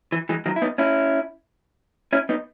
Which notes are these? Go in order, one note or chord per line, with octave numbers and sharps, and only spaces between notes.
E3
E3 G#3
D#3 F#3
E4
B3 D#4
C#4 E4
C#4 E4
B3 D#4